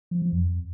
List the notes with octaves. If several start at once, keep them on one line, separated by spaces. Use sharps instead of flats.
F3
F3
F2